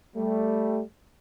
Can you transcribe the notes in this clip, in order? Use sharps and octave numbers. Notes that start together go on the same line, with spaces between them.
G3 A3